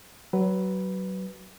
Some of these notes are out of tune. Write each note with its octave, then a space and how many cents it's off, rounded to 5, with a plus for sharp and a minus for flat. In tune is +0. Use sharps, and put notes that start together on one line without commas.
F#3 +25 B4 +0